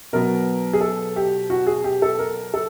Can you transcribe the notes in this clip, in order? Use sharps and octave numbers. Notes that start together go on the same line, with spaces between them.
B2 F#3 B3 A#4
G#4
A4
G4
F#4
G#4
G4
A4
A#4
A4